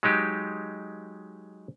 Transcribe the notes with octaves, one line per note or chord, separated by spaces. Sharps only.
F#3 G#3 D#4 G4